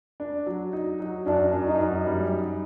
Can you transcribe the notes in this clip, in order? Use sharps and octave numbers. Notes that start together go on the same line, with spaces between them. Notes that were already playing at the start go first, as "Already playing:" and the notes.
D4
F#3
D#4
F#3
F#2 D4
F#2
D#4
F#2
G3
D#4